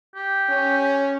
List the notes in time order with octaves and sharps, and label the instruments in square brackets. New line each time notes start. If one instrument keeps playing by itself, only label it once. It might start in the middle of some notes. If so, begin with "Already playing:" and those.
[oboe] G4
[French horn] C#4